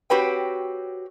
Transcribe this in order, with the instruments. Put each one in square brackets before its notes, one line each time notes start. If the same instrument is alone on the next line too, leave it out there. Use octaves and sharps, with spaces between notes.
[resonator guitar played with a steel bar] C4 F#4 G4 B4 C#5 G5